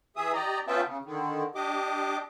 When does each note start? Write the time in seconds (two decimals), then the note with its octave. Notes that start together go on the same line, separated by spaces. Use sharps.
0.16 E3 G#4 E5 D#6
0.33 G4 D5 D#5 A#5
0.67 B3 C#4 F4 E5 G5 A5
0.86 C#3
1.05 D3 D#3
1.55 D4 G4 D#5 D6